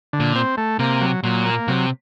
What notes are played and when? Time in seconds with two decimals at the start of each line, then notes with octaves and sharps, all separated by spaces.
0.13 D3
0.20 A#2
0.35 C4
0.57 A3
0.79 C3 A#3
1.01 F#3
1.23 A#2 F#3
1.46 A#3
1.68 C3 F#3